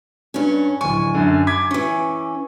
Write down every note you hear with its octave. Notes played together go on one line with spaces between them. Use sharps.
G2 C#4
D1 G#5 C#6
F#2 D3
D6 G#6 B6
E3 C#4